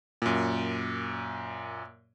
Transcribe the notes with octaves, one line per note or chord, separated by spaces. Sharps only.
F#2 A#2